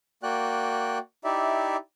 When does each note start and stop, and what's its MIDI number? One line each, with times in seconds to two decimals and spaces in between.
0.23 0.98 58
0.23 0.98 66
0.23 0.98 74
0.23 0.98 79
0.23 0.98 90
1.24 1.76 63
1.24 1.76 64
1.24 1.76 67
1.24 1.76 74
1.24 1.76 76